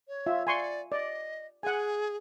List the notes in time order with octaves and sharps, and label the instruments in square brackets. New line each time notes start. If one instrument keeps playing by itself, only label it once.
[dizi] C#5
[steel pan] F4 E5
[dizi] D5 [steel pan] G#5 C6 C#6
[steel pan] D5 [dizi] D#5
[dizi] G#4 [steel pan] F#5 G#5